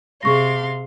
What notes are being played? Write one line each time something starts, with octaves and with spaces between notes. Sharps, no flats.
C3 G#4 F5 C6 C#6 A#6